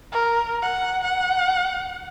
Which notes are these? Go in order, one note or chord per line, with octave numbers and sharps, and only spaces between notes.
A#4
F#5
F#5